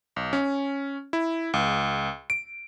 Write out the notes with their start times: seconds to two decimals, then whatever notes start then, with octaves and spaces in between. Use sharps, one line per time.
0.16 B1
0.33 C#4
1.13 E4
1.54 C#2
2.30 D7